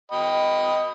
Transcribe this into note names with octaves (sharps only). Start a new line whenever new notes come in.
D#5 G5 B5